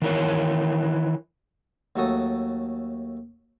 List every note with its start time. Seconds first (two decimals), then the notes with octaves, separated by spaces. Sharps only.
0.02 D#3 E3 A#4 C#5
1.96 D#2 F#3 A3 F#4 A4 D#6